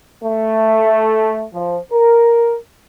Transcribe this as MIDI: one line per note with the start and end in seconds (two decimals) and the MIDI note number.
0.23 1.44 57
1.54 1.78 53
1.92 2.55 70